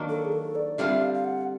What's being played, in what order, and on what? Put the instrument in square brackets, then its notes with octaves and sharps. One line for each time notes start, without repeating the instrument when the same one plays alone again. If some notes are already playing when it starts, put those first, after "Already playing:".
Already playing: [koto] D#3 F#3 A#3 D4
[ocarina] A4
G#4
A4
D5
[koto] D3 G3 C4 F4 [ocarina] E5
[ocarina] F5
F5
F#5